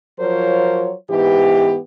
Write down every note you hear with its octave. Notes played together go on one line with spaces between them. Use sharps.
F3 F#3 F4 A#4 C5 C#5
G#2 E3 B3 G4